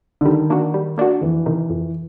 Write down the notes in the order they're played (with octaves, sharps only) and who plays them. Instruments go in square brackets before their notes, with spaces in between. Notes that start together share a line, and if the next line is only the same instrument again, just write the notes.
[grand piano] D3
[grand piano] D#3 [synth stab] G3
[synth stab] A#3 D4 F#4
G3
A#3 D4 F#4
[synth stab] F2 [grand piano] E3
[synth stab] C3 D#3
F2